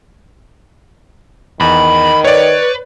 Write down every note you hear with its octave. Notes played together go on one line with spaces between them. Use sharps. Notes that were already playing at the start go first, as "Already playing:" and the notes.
E2 D#3 B5
B4 C#5 D5